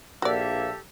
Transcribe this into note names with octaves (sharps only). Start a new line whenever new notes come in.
A#1 A#3 F#4 G4 A4 D5 E5